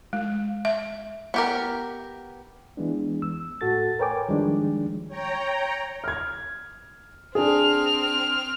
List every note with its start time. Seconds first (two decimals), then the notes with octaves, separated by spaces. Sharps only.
0.13 G#3
0.65 E5
1.34 B3 G4 A#4
2.77 E3 G#3 B3 D4
3.22 E6
3.61 A2 F#4 A4 A6
3.99 A#4 B4 C#5 G5 G#5 D6
4.29 D#3 F3 G3 G#3 D4
5.08 C#5 G5 A#5
6.04 F6 G#6
7.35 C4 D4 G#4 F6